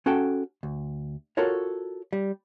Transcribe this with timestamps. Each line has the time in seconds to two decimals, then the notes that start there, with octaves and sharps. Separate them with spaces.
0.06 C#4 F#4 A4 F#5 G5
0.63 D2
1.37 F4 F#4 A4 A#4 C#5
2.13 G3